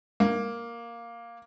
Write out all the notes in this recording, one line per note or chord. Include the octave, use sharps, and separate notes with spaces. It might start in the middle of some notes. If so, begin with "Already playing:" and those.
A#3